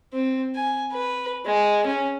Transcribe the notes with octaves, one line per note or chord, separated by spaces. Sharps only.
C4
G#5
B4
G#3
C#4